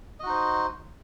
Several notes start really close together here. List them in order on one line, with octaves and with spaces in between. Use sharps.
D#5 F#4 D#4 C5